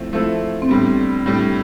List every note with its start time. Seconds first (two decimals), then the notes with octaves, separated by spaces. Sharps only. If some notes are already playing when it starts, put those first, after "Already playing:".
Already playing: F3 A3 C4 E4
0.13 F3 A3 C4 E4 A4
0.62 C4
0.69 A2 G3 B3 D4
1.26 A2 G3 D4